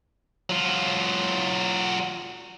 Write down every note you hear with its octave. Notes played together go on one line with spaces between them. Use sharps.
F#3 F4